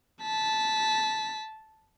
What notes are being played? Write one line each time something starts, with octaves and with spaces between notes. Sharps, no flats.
A5 B6